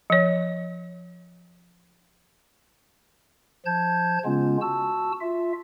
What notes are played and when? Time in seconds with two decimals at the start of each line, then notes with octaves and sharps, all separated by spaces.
0.10 F3 C#5
3.66 F3 A5 G6 G#6
4.25 C#3 G#3 B3 C#4 F4
4.61 F#4 A5 E6
5.21 F4 E5